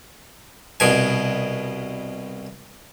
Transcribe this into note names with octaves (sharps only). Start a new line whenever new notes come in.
C2 B2 G#5